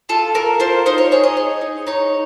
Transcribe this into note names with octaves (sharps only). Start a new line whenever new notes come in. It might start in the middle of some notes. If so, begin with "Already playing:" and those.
F4 A4
A4 A#4
F4 C5
D#4 C5
C#5
G#4 C#5
D#5
G#4
D#4
D#4 C#5